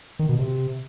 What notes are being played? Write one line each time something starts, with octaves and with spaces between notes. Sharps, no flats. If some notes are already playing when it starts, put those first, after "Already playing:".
D#3
B2
C3